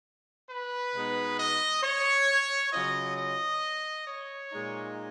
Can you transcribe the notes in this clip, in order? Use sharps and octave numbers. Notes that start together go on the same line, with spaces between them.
B4
B2 G#3 B3 D#4
D#5
C#5
C#3 F#3 C#4 F4 D#5
D#5
C#5
A#2 G#3 D#4